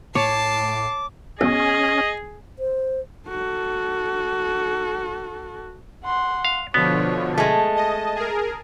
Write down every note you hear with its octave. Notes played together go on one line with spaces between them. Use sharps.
A2 C#5 A5 D6 C7
B1 C#4 G#4 D#5
C5
F#4 A4
F#5 C6
F5
B2 D3 F3 B3 C#5
G#3 A3 A5
D#5
G#4 A#4